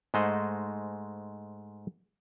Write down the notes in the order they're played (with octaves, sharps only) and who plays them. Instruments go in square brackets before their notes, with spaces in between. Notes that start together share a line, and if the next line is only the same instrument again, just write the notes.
[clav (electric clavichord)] G#2 G#3 A3 C5 D#5 F#5